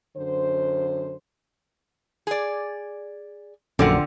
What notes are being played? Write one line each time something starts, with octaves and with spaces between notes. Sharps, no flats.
F#2 D3 C5
G#4 D5
A#1 F#2 D3 C4 F4 D5 F#5